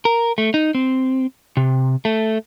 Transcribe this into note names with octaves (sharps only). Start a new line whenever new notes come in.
A#4
A3
D#4
C4
C3
A3